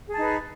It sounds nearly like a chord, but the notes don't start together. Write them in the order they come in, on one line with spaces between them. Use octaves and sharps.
G#4 A5 D#4 B4